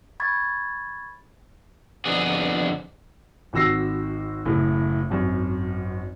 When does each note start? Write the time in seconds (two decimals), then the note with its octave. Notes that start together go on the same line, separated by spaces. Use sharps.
0.20 B5 C#6 G#6 A6
2.05 F2 D3 B3 G#4
3.53 G#1 D#3 F#4 E6 A#6 C7
4.45 F#1 A2
5.10 G#1 F#2